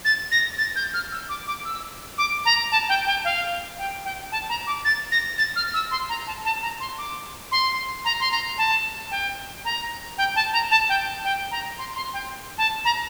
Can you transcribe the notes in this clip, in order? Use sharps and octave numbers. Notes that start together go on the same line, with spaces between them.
A6
A#6
A6
G6
F6
E6
D6
D6
E6
D6
A#5
A5
G5
G5
F5
G5
G5
A5
A#5
D6
A6
A#6
A6
F6
E6
C6
A#5
A5
A5
A#5
C6
D6
C6
A#5
C6
A#5
A5
G5
A#5
G5
A5
A#5
A5
G5
G5
A#5
C6
C6
G5
A5
A#5